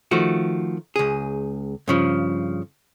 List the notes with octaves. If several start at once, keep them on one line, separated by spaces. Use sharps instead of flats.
D#3 F3 A3 F#4
C#2 G#4
G2 C#3 F3